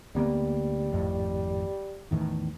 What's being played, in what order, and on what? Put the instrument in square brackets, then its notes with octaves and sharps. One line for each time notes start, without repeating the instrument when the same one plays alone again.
[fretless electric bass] D2 A#3 B3 [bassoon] G3
[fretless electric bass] G#1 F2 A2
E2 A2 D#3